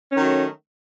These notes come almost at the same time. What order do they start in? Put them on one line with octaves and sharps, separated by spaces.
C#4 D#3 F#3 A3